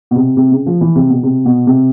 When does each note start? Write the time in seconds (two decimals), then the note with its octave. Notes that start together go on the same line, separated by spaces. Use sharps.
0.11 B2
0.16 C3
0.37 C3
0.51 C#3
0.66 F3
0.81 E3
0.95 C3
1.10 B2
1.23 C3
1.45 B2
1.67 C3